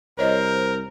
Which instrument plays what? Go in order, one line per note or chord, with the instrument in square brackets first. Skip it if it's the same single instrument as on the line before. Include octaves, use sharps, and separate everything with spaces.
[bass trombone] C2 [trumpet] A#4 [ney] C5 [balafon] C#5 D#5